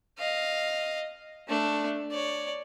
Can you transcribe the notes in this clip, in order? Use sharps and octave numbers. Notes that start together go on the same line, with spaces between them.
D#5 F5
A3 D4
C#5 D5